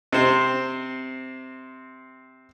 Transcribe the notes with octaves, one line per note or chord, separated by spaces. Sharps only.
C3 C4